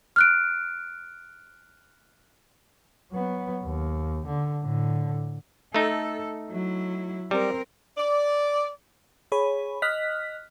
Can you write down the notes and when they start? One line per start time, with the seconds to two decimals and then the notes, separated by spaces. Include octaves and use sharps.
0.16 F6 F#6 D7
3.12 F#3 B3
3.63 D#2
4.27 D3
4.63 A2 D3
5.74 A3 D#4 A4
6.50 F#3 E4
7.31 G3 C4 A#4
7.98 D5
9.32 G#4 C#5 B5
9.82 D#5 F6 F#6 B6